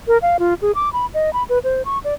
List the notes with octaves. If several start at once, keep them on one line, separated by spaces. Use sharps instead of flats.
A#4
F5
F4
G#4
D6
B5
D#5
B5
B4
C5
C#6
D5